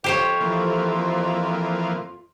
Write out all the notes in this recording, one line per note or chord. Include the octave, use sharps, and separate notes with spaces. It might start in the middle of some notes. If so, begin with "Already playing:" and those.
F2 F4 G4 C5 C#5
E3 F3 A#3